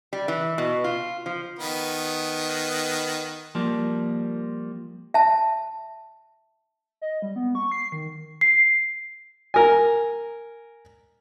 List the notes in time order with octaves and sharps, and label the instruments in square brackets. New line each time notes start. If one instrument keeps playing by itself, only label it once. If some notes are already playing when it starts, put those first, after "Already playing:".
[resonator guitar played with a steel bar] G3
E3
B2
F4
F3
[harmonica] D#3 B3
[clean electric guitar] F3 G3 A#3
[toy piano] E5 A5
[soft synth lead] D#5
G3
B3
C#6
C7
D#3
[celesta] C7
[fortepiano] A#4 G#5